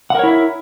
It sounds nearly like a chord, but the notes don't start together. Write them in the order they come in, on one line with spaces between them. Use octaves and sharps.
F#5 A#4 C#5 E4 E5